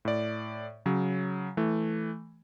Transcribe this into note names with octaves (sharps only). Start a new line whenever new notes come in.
A2 D5
C#3 F#3
E3 A3